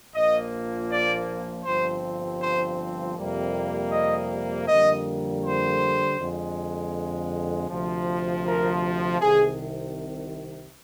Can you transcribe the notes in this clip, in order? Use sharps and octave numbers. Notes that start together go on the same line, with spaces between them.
A#1 A#2 F3 A#3 D#5
D5
G1 G2 F3 C4 C5
C5
F2 C3 G3 A#3
D#5
F2 D3 G3 A#3 D#5
C5
F2 D3 G#3
D2 C3 F3
A#4
C2 C3 D#3 G#4